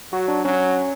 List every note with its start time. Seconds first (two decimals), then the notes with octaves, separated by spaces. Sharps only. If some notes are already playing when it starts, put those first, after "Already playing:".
0.12 F#3 F#4
0.28 D4
0.45 F#3 C#4